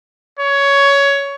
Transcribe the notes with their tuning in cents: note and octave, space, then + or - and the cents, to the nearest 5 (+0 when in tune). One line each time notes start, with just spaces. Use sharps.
C#5 +15